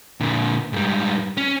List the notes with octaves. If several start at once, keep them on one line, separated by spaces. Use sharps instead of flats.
A#2 D3
G#2 G3
C#4